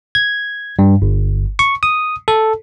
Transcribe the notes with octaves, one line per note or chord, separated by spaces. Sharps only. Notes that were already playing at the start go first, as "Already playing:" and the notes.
G#6
G2
G1
C#6
D#6
A4